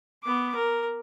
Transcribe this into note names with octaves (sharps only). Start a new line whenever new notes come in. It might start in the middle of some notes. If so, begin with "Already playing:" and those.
B3 D6
A#4